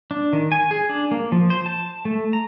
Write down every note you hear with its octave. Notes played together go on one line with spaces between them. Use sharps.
D4
D#3
G#5
G#4
D4
A#3
F3
C5
A5
A3
A#5